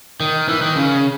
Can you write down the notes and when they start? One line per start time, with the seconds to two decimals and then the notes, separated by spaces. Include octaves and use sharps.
0.20 D#3
0.48 E3
0.62 D#3
0.76 C#3